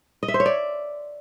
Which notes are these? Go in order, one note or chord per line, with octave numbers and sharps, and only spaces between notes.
D#5
E5
C5
C#5
D5